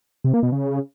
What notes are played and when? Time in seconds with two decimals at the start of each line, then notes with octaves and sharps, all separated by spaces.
0.24 C3
0.34 A#3
0.43 B2
0.52 C#3